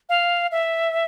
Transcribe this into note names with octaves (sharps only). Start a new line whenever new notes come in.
F5
E5